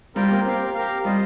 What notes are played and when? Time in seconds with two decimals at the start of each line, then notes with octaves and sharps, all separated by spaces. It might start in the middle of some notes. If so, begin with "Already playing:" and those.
0.16 G3 C4 F4 A#4 G5
0.31 A#3
0.45 C4 G4 A#4 F5
0.75 G4 A#4 F5
1.05 G3 F4 C5 D#5